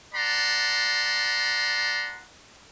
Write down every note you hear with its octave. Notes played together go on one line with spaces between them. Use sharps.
D5 F#5 A5 A#5 C6